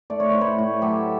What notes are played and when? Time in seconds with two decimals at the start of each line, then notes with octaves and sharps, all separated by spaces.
0.10 A3 D5
0.20 C#5
0.30 A2 C5
0.41 B4 C#5
0.59 A2
0.81 F#3 G4 A4